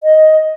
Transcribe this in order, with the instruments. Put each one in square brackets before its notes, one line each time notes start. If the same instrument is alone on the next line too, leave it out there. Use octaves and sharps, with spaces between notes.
[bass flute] D#5